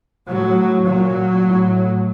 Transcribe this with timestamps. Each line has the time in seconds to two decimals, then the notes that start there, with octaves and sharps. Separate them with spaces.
0.28 A2 F#3
0.86 A#2 F#3
1.43 A2